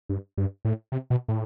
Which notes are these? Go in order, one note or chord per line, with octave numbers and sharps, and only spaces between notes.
G2
G2
A2
C3
B2
A2